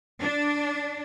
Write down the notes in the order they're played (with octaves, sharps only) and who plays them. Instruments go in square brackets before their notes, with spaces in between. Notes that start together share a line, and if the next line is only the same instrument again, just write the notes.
[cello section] D4